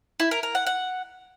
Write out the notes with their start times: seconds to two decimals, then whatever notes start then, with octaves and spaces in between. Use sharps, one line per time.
0.20 E4
0.31 A#4
0.43 A#4
0.55 F#5
0.67 F#5